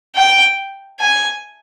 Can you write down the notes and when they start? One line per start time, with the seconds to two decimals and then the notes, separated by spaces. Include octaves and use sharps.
0.16 G5
1.00 G#5